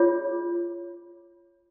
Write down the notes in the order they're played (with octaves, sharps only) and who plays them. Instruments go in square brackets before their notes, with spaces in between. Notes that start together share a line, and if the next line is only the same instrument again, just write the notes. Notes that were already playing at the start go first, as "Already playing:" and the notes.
Already playing: [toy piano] F4 G#4 C#5